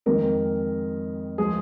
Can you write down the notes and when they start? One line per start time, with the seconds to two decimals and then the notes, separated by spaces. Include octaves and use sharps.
0.06 F2 D#3 G#3 A#4
1.38 F3 G#3 G#4